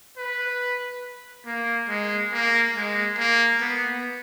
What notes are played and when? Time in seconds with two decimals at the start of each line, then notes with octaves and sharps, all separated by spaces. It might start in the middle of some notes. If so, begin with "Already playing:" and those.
0.17 B4
1.46 A#3
1.89 G#3
2.32 A#3
2.76 G#3
3.18 A#3
3.61 B3